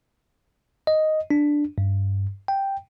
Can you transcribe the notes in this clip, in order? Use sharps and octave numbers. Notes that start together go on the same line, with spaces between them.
D#5
D4
G2
G5